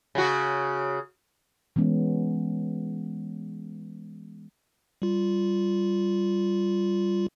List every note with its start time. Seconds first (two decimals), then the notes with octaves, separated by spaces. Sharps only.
0.15 C#3 F#4
1.76 E3 G#3 B3 C#4
5.02 G3 F4